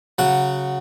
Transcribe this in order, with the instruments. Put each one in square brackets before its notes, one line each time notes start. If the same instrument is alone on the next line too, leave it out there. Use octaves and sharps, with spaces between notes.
[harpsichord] C#3 F#3 F#5